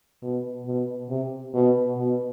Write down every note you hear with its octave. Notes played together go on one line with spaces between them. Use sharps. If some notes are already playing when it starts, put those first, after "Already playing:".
B2
B2
C3
B2
B2